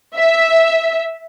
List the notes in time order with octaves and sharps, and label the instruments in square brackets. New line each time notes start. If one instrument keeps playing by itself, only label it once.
[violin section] E5